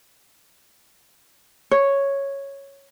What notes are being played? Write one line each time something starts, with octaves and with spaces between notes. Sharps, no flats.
C#5